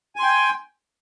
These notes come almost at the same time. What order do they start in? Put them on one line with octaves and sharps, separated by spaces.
G#5 C6 G5